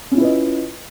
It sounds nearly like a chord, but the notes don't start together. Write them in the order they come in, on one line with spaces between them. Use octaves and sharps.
C#4 F4 E4 B4 D#5